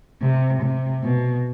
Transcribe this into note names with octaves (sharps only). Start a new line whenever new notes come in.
C3
C3
B2